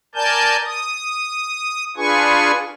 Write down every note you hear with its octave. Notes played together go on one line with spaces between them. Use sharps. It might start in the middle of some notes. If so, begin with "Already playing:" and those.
A#4 D5 G#5 A5 G6
D#6
D4 F4 G#4 B4 G#5 C#6